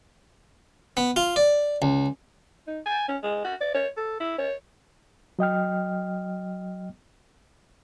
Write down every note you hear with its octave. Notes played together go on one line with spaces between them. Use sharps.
B3
F4
D5
C#2
D#4
G#5
C#4
G#3
F#4
D5
C#5
A4
E4
C#5
F#3 D#5 G5 F6